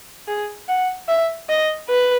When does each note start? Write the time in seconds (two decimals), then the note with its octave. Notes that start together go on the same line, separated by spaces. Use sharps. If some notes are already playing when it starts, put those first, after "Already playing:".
0.28 G#4
0.68 F#5
1.08 E5
1.49 D#5
1.89 B4